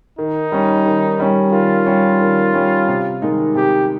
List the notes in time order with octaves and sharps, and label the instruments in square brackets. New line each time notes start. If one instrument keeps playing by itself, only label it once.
[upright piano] D#3 [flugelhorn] D#4
[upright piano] G3 C#4
D#3
G3 C#4
[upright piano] D#3 [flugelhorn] F4
[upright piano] G3 C#4
D#3
G3 C#4
C3
D#3 G#3 D#4
[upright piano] C3 [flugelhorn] G4